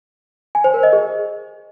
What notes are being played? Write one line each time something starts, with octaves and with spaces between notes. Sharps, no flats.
G#5
C5
A#4
D#5
G#4